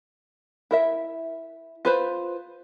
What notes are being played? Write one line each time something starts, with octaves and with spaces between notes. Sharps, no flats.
E4 A#4 E5
F4 B4 C5